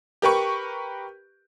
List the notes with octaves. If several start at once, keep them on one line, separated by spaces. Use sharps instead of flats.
G4 A#4 B4 C#6